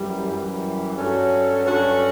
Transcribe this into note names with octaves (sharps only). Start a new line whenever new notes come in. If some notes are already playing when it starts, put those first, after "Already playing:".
Already playing: F#2 E3 G3
F#2 E3 G3
G2 F#3 C#4 F#4 A4
G2 F#3 C#4 F#4 A4